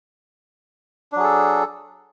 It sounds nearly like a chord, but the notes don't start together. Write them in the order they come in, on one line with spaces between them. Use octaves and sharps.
D4 F#3 G#4 A4